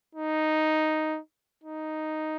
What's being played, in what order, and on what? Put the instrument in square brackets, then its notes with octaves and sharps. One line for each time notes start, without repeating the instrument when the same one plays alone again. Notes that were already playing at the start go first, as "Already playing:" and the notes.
[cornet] D#4
D#4